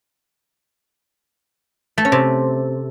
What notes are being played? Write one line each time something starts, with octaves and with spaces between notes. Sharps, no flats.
A3
C#4
C3